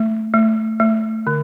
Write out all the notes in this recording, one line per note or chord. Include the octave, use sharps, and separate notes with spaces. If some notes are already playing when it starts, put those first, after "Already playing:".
Already playing: A3
A3
A3
D3